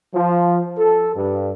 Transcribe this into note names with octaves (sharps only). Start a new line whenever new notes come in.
F3
A4
G2